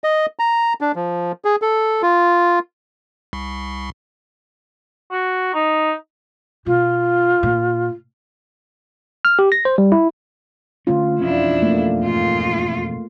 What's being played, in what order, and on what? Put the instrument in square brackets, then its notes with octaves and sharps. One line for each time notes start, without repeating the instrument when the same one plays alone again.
[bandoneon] D#5
A#5
D4
F3
G#4
A4
F4
[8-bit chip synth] C2
[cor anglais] F#4
D#4
[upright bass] B2 [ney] F4
[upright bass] A#2
[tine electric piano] F6
G4
A#6
C5
G3
E4
[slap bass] D3 A3 C#4 [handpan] F4
[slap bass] E1 F2 C#4 [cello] D4 E4
[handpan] A3 A#3
[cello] G#2 F4